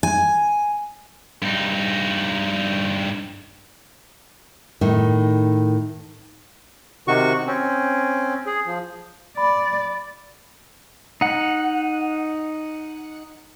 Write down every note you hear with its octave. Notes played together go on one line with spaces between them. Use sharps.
G#5
G2 D#4
A2 D#3 D#4
C3 D#3 F#4 C#6
C4 C#4
G#4
F3
D5 B5
D#4 F#5